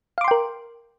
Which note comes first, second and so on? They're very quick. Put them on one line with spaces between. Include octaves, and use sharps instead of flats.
F5 D6 C6 G5 A#4